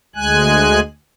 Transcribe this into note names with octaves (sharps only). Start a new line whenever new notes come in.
D2 G#3 G#5 F#6